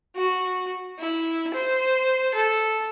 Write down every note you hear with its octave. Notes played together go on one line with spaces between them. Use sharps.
F#4
E4
C5
A4